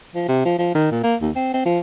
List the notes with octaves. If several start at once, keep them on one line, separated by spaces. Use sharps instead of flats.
F3
C3
F3
F3
D#3
A#2
A#3
D#2
C4
C4
F3